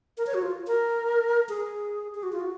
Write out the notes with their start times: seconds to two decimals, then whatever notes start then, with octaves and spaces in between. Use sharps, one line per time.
0.18 A#4
0.27 C#5
0.34 F#4
0.42 F4
0.67 A#4
1.49 G#4
2.15 G#4
2.23 F#4
2.33 F4
2.41 F#4